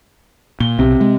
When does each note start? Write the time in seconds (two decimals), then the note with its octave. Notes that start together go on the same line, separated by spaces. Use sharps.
0.60 A#2 G7
0.79 B1 C3
1.01 G#3